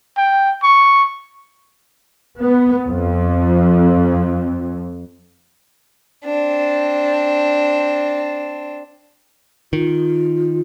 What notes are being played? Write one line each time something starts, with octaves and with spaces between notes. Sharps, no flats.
G5
C#6
B3
F2
C4 D4
D#3 F4